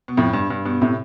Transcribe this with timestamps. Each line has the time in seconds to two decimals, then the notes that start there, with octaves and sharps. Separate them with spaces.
0.08 B2
0.17 F2 A2
0.33 G2
0.50 G2
0.65 G2 B2
0.82 A2 C3